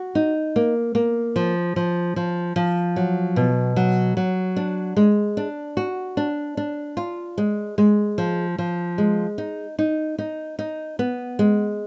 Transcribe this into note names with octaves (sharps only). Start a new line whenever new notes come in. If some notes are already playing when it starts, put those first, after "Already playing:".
Already playing: F#4
D#4
A#3
A#3
F3
F3
F3
F3
F#3
B2
F#3
F#3
D4
G#3
D4
F#4
D4
D4
F4
G#3
G#3
F3
F3
G#3
D#4
D#4
D#4
D#4
B3
G#3